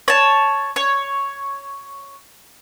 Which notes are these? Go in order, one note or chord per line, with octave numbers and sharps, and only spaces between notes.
C#5 A5
C#5